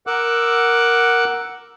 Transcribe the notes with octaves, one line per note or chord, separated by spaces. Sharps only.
A#4 F#5 D6 E6 F#6